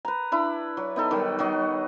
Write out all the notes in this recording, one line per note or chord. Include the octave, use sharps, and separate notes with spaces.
B4 A#5
D4 E4 B5
F#3
B3 D#4 A4
D#3 F#3 G3
F#3 G3 F#4 D#5